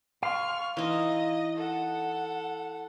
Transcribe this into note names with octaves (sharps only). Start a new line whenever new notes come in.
F5 C6 C#6 F6
E3 D#4 D#5
A4 F#5